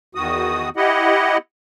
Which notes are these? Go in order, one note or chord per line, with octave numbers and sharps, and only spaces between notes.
E2 D#3 F#4 D#6
E4 G4 D#5 F#5